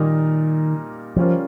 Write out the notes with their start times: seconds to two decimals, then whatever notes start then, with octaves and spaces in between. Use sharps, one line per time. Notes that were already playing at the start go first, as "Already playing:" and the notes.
Already playing: A#2 D#3 G3 A#3 D#4 A#4
1.16 C#3 F3 G3 C#4 F4 A#4